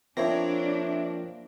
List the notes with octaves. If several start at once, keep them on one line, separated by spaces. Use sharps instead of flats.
F3 A#3 C4 D4 E4 C#5 A#6